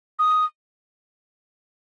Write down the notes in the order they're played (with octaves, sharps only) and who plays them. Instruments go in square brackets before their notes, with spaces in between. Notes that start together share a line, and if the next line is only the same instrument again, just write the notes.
[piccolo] D#6